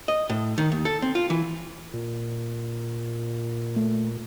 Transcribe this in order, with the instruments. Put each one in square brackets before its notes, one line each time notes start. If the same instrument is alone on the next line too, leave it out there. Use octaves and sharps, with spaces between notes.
[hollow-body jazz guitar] D#5
A2
D#3
D#2
A4
C4
F4
E3
[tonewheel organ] A#2
[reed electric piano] A3